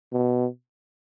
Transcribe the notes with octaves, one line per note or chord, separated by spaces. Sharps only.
B2